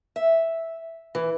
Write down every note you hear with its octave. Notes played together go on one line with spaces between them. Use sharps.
E5
E3